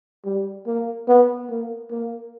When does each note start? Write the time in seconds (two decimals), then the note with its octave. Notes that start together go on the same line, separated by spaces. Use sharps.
0.25 G3
0.67 A#3
1.08 B3
1.50 A#3
1.91 A#3